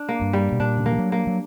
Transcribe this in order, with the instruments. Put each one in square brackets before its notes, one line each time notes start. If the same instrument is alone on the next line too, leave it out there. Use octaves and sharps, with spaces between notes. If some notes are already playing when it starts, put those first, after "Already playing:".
Already playing: [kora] D4
A#3
[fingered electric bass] G2
[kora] G3
[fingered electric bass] B2
[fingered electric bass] A#2 [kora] D4
[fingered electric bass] C#3
[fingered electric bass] D3 [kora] A#3
[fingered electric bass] E3
F#3
[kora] A#3
[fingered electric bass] F#3